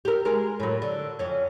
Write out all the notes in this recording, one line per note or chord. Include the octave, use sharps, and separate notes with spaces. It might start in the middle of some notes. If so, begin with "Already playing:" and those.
G4 A#4
G#3 A#4
A2 F#3
D3
F2 C#4